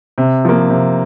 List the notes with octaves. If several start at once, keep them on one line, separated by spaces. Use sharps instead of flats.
C3
F3 A#3
C3